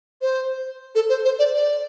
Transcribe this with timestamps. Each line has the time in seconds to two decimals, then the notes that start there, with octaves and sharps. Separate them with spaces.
0.22 C5
0.95 A4
1.09 C5
1.25 C5
1.39 D5
1.54 D5